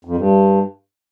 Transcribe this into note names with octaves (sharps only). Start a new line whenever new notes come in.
F2
G2